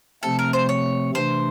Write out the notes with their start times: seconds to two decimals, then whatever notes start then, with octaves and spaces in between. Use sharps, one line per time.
0.23 C3 F3 A3 C4 A4
0.39 A#4
0.53 C5
0.69 C#5
1.15 C3 E3 A3 D4 C5